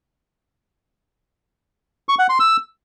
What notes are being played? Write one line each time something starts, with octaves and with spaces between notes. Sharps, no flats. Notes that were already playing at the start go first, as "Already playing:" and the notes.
C#6
F#5
C6
E6